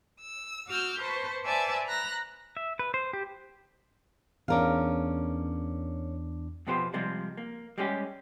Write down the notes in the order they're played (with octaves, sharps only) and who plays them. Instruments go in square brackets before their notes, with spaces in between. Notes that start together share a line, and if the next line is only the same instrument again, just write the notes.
[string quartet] E6
F#4 D6 E6 F6 G6
B4 C5 A5 C#6
B4 C5 D5 E5 G#5 A5
A#5 B5 F#6 A#6
[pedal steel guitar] E5
B4
C5
G4
[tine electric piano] E2 D4 D6 [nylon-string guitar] C#4 A#4 F5
[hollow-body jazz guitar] F2 B2 B3 F4 G4 C5
C3 F3 G3 G#3 C4
A#3
G3 G#3 C#4 F#4 G4